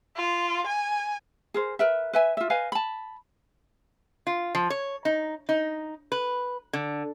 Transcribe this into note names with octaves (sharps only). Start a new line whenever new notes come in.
F4
G#5
G#4 A#4 C5
A#4 B4 E5
B4 E5 G#5
F4 E5
B4 D#5 F5 G#5
A5 B5
F4
F3
C#5
D#4
D#4
B4
D3